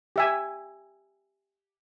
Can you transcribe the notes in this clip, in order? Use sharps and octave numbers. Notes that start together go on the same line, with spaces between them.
G4 E5 G#5